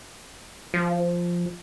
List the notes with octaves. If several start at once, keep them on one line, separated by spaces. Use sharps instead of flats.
F3